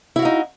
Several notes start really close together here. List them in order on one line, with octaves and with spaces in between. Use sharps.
E4 F#4 F5 D#4